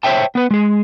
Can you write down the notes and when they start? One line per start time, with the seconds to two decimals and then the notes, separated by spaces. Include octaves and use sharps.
0.03 C5 C#5 E5 G5 A5
0.35 B3 B4
0.51 G#3 G#4